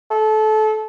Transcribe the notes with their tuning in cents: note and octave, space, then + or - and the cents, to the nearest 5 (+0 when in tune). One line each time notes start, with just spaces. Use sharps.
A4 -25